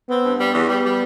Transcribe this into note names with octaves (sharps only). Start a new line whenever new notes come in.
B3 C4
G2
G3 B3
E2
G3
G3